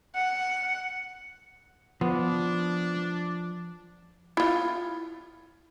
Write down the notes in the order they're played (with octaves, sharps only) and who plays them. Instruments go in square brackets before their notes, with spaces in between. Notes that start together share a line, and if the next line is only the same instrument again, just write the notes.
[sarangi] F#5
[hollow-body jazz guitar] F3 [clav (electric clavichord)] B3 [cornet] D4
[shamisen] E4 F4